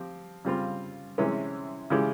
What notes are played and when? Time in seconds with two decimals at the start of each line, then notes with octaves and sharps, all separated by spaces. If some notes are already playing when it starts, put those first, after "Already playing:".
Already playing: F3 C4 G4
0.45 C#3 G3 C4 F4
1.18 C3 E3 G#3 C#4
1.90 C#3 E3 G#3 C#4 G4